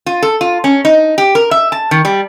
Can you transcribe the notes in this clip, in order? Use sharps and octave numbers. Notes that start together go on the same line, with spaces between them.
F4
A4
F4
C#4
D#4
G4
A#4
E5
A5
D#3
G3